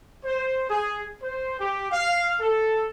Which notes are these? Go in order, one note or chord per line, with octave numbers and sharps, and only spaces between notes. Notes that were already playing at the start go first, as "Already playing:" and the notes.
C5
G#4
C5
G4
F5
A4